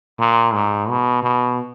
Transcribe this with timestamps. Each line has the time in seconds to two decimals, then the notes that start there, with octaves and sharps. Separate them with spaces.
0.20 A#2
0.54 G#2
0.89 B2
1.23 B2